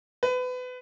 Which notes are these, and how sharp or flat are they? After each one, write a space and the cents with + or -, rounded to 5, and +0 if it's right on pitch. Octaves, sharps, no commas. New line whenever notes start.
B4 +30